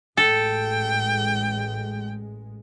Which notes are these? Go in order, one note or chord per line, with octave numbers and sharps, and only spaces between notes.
A1 G#3 A4 G5